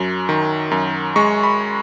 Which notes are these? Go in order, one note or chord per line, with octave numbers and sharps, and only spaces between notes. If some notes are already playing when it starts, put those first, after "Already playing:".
Already playing: F#2 F#3
D#3
F#2
G#3 C#6
B5